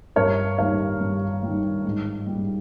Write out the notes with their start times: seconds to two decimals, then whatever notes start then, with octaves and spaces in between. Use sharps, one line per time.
0.16 G2 A#4 C#5
0.58 D#3 G3 C#5 F5
1.01 G2
1.43 D#3 G3
1.85 G#2
2.27 G3